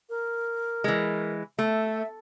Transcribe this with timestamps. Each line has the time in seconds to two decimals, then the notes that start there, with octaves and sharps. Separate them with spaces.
0.10 A#4
0.84 E3 G#3
1.59 A3 E5